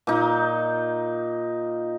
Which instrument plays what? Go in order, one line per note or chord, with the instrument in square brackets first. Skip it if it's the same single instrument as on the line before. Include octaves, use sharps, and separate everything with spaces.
[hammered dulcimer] A#2 D#4